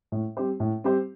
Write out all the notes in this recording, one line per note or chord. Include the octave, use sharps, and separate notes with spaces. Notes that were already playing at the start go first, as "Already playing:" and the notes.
A2
G3 C4 G4 C5
A2
G3 C4 G4 C5